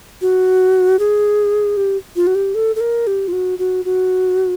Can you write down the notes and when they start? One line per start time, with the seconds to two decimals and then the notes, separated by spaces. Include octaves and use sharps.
0.21 F#4
0.99 G#4
1.77 G4
2.16 F4
2.27 F#4
2.35 G4
2.55 A4
2.76 A4
2.81 A#4
3.07 G4
3.28 F4
3.33 F#4
3.59 F#4
3.85 F#4